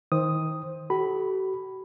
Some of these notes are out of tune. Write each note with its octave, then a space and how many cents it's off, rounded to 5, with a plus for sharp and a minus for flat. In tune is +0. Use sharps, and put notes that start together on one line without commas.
D#3 +30 C5 +10 D#6 +0
F#4 +45 A4 -30 B5 +0